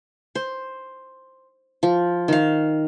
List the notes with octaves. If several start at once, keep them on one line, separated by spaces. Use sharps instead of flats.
C5
F3
D#3 F5